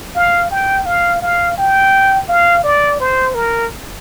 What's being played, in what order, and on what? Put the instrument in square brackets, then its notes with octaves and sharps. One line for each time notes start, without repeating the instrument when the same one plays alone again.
[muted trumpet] F5
G5
F5
F5
G5
F5
D5
C5
A#4